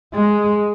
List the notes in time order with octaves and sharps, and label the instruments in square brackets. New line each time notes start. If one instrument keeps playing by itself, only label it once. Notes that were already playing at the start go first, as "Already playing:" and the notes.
[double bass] G#3